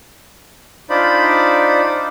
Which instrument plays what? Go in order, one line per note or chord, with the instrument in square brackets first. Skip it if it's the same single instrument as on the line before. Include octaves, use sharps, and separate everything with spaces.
[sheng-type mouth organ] D4 D#4 F4 C5 D5 B5